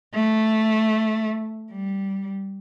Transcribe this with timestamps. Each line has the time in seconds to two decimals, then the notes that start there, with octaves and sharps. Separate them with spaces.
0.14 A3
1.72 G3